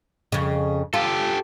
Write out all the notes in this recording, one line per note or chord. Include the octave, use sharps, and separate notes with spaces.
F2 C#3
F4 G4 A4